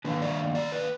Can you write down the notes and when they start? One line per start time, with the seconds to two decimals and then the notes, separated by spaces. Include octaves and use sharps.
0.05 D#3 A#3 D4 B4
0.22 D5
0.55 D5
0.72 B4